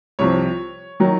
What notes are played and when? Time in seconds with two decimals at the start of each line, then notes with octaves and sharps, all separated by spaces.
0.19 C2 C3 F3 C#5
1.00 D#3 F#3